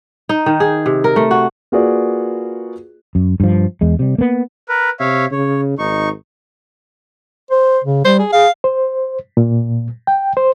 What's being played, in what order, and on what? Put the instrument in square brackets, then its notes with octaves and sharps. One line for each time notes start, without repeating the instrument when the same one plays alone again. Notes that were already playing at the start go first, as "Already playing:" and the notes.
[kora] D#4
D#3
G#4
C3
A#4
A3
F#4
[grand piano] A#3 F4 F#4 G#4 B4 D5
[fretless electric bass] F#2
G2 F3
E2 G#3
C3 G3
A#3 B3
[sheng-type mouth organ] A#4 B4
[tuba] C3 [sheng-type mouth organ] C#5 E5 F5
[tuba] C#3 [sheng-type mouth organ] C#5
[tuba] G#1 [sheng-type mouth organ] D#4 C#6
[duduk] C5
C#3
[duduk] G3 [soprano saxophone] C5
[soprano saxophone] G#4
[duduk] G#4 [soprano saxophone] F5
[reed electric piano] C5
A#2
G5
C5